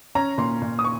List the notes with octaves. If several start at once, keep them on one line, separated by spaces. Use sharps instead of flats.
C#4 A#5
A#2 C6
A#2
D#6
C#6